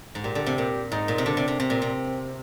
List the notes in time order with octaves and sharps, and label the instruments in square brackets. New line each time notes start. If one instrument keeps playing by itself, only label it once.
[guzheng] G#2
[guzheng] A#2 [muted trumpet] G4
[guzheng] D3
C3
A#2
[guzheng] G#2 [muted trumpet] D#4
[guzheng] A#2
C3
[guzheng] D3 [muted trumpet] D4
[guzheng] C3
C3
[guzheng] C3 [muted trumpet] C4
[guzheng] A#2
C3